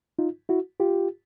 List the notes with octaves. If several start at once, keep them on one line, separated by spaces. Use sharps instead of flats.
D#4 F4
E4 F#4
F4 G4